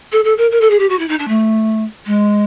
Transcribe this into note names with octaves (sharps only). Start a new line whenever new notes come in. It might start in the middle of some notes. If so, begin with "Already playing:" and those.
A4
A4
A#4
A#4
A4
G#4
G4
F#4
E4
D#4
D4
A3
G#3